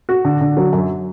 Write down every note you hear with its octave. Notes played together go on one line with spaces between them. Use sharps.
F#4
D3
D3
F#3
F#2